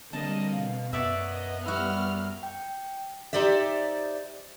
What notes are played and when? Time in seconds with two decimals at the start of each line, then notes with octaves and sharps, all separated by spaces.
0.13 D3 G3 A#3 C4 D4 D#5 A5
0.53 B2 F5
0.93 F#2 B3 C#5 D5 E5
1.28 D#5
1.66 G3 E4 F#4 F6
2.43 G5
3.33 D#4 G4 C5 D5 E5